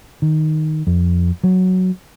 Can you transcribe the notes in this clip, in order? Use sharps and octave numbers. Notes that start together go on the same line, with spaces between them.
D#3
F2
F#3